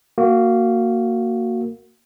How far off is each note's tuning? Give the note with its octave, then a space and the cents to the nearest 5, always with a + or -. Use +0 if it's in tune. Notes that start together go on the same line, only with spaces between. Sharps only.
A#3 -15 F#4 +0